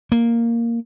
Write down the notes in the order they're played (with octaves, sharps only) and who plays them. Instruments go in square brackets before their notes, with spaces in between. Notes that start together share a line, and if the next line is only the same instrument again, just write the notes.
[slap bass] A#3